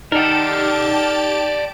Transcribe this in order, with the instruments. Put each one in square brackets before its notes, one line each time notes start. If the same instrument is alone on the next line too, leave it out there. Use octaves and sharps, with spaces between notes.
[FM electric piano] D#4 [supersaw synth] G4 A5 D7 [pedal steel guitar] A4 A#4 [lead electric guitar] D5 F#5